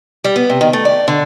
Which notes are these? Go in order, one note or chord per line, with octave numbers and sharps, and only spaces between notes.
G3
B3
C3
D#3
A3
D5
D3